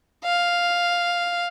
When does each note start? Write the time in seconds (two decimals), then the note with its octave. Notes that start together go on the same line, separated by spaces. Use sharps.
0.24 F5